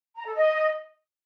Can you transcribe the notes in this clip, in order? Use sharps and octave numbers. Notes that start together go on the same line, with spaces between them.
A#5
A4
D#5